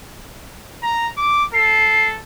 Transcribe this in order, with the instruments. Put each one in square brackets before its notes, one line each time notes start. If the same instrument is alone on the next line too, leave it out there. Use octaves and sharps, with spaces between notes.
[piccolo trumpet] A#5
D6
[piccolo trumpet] A4 [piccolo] C7